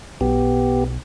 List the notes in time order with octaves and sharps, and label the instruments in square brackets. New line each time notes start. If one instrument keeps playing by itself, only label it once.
[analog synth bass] B1 [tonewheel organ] B3 G4